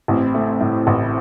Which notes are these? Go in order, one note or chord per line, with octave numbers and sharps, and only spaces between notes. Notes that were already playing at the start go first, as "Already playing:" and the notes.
A1 C4 E4
A3
A2
A1